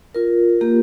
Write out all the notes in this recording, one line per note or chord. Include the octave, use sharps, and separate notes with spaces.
F4 A#4
A#3 G4